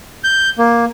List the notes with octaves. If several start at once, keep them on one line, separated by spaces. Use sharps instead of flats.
G6
A#3